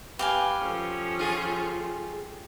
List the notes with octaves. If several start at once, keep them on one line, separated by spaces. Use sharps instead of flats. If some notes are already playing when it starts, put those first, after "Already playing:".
G4 B4 F5 G#5
F3 C#4 A4
F4 G#4